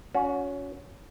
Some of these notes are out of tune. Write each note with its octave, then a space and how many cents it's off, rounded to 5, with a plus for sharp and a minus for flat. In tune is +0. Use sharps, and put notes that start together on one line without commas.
C#4 +20 F#4 -25